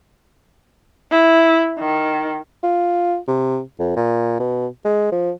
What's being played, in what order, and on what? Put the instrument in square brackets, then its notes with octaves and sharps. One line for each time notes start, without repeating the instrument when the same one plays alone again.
[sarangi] E4
D#3
[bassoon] F4
C3
F2
A#2
B2
G#3
F3